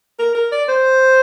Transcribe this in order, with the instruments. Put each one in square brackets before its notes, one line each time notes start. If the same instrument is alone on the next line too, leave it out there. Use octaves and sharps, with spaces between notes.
[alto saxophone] A#4
A#4
D5
C5